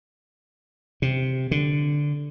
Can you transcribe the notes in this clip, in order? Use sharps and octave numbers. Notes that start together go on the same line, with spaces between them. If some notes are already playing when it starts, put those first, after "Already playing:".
C3
D3